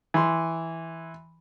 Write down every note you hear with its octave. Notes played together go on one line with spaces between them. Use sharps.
E3 C6